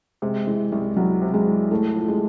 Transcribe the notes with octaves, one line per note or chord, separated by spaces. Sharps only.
C3 G#3
E3 G#3
C2 G#3
C2 F#3
C3
G#3
E3
A2 A3
F3
G#3